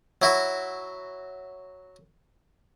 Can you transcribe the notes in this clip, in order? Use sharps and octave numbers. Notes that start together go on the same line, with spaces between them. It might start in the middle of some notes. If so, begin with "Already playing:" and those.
F#3 E4 F#4